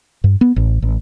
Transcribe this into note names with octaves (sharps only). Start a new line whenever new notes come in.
G2
B3
A1
A1